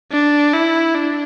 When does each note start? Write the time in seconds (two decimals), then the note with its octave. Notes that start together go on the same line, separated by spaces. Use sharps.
0.11 D4
0.53 E4
0.94 D4